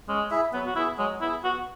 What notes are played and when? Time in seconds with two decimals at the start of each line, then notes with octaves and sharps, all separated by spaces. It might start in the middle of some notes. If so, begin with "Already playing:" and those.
0.08 G#3 C#4
0.31 E4 G#4 E5
0.53 F#3 B3
0.66 F#4
0.76 B3 E4
0.78 G#4
0.98 F#3 G#3
1.21 B3 E4
1.25 G#4
1.43 B3 F#4